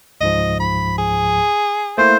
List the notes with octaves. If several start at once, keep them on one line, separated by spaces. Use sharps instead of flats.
C#2 G#2 F3 D#5
B5
G#4
A3 A#3 E4 C5